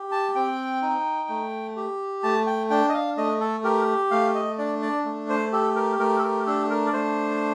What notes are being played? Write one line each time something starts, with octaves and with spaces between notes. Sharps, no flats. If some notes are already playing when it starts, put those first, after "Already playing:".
Already playing: G4
A5
C4 G5
D#4
A3
G4
A3 A5
G5
D4 G5
D#5
F5
A3 D#5
A4
G4 A#4
A3 F5
D#5
D4 D5
D5
A3
C5
G4 A4
A#4
A3 A#4
A4
A#4
D4 A4
A#4
D5
A3 C5